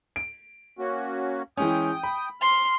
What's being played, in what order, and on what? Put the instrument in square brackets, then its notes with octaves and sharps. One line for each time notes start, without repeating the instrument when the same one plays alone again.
[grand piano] D7
[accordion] A#3 C#4 F#4
[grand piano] E3 G#3 C#4 [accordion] G5 D#6
[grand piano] B5
[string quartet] C6 [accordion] F6